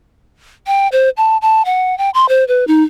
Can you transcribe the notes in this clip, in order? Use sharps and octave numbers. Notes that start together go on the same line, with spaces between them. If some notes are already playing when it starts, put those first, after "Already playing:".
G5
C5
A5
A5
F#5
G5
C6
C5
B4
D#4